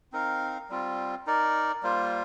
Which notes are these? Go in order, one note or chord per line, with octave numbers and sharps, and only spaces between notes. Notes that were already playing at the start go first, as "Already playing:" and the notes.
C4 D#4 A#4 F5
G3 C4 F4
D#4 A#4 D5
G3 A#3 F4 C5